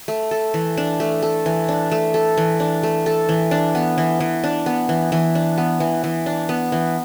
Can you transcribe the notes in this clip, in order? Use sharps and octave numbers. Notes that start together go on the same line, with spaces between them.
A3
A4
E3
D4
A3
A4
E3
D4
A3
A4
E3
D4
A3
A4
E3
D4
B3
E3
E3
D4
B3
E3
E3
D4
B3
E3
E3
D4
B3
E3